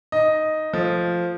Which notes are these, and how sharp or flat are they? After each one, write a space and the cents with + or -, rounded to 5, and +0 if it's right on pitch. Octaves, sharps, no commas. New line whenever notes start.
D#4 +0 D#5 +0
F3 +0 A3 +0